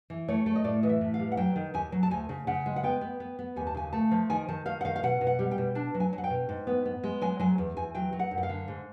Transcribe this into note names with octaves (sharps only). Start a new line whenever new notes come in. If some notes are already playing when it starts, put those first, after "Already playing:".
E3
A3 C#5
A3
D#5
A2 D5
E3 D#5
E5
A2
F5
G3
F#5
F#3 G5
D#3
D#2 G#5
F#3
A5
D2 G#5
C#3
C#3 F#5
G#3
F#5
B3 G5
B3
B3
B3
D#2 G#5
A5
C#3 G#5
A3 A5
F3
D#3 G#5
D#3 A5
D#3 F5
F#5
D#3 F5
F5
B2 F#5
B2
F#5
G3
G5
B2
D4 A5
F#3
G#5
F#3
F#5
G5
B2
G#2
B3
B3
G#3
F#3 G#5
F#3 G#5
E2
E2 G#5
F#3 G5
F#3
F#5
F#2
F#5
F5
D3
G#2